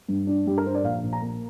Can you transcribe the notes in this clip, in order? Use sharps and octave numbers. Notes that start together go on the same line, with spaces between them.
G2
D4
G2 G4
A#4
D4 C5
D5
A#1 F5
A#1
A#5
A#3